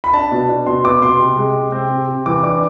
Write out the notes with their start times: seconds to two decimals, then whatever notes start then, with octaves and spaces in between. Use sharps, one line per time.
0.04 B5
0.13 D4 A5
0.31 B2
0.49 D4
0.67 B2 C6
0.84 B3 D6
1.02 B2 C6
1.20 C3
1.37 G#3
1.56 C3
1.72 C4
1.90 C3
2.08 C3
2.26 E3 D6
2.43 D4 D6